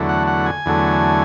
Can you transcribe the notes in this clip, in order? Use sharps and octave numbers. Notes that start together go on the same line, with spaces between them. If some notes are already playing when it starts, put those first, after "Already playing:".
Already playing: E2 D3 F#3 A3
F#5
F#5
G#5
E2 D3 F#3 A3